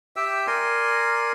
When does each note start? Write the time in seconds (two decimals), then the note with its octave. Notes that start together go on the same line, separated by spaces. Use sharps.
0.16 G4 E5 G5 E6
0.47 A#4 D5 G#5 C6